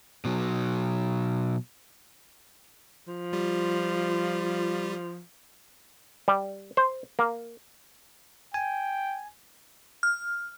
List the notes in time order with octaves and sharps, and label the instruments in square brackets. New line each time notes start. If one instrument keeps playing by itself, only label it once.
[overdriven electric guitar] B2 F#3
[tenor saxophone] F3
[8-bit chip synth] G3 F4 G4
[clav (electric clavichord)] G3
C5
A#3
[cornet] G5 [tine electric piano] G#5
[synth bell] F6